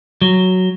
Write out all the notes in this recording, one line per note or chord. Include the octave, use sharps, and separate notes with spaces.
F#3